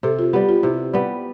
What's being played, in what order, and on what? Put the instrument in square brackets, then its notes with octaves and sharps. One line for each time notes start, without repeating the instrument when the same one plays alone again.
[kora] C3 [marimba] A4
[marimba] F4
[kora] G3 B3 [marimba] G4
[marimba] F4
[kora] C3 [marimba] E4
[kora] G3 B3